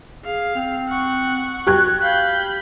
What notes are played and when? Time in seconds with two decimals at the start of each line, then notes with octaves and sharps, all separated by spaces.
0.25 G#4 F5
0.55 C4
0.88 F#5 C#6
1.67 F#4 G4 F#6 G#6
2.02 F5 B5 G6